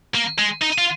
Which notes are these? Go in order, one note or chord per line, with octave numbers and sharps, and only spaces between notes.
A#3
G#3
D#4
F4